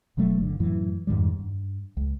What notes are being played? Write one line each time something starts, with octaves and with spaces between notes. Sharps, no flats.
D#1 B2 F#3 A3
G1 D3
F#2 A2 E3
F2 G#2 D#3 G3
G2
C#2